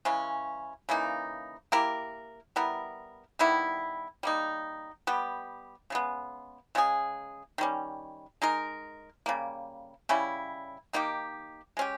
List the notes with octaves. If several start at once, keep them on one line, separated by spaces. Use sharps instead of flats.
C#3 E3 G#3 C#4
C#3 E3 A#3 D#4
A#3 E4 G4 A#4
G3 B3 E4 A#4
D#3 G3 B3 E4
G3 A#3 D#4
G3 B3 G4
C#3 G#3 B3
C#3 G#3 C#4 G#4
D#3 G3 C#4
G#3 D#4 A#4
C#3 G3 A#3
C#3 G3 C#4 E4
D#3 A#3 D#4 G4
G#3 C#4 G4